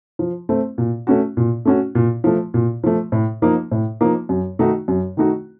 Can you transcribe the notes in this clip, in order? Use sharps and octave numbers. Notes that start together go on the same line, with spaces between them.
F3
A3 C4
A#2
A3 C#4 F#4
A#2
A3 C#4 F#4
A#2
F3 A3
A#2
F3 A3
A2
F3 A#3 D#4
A2
F3 A#3 D#4
F#2
D#3 A3 D#4 F#4
F#2
D#3 A3 D#4 F#4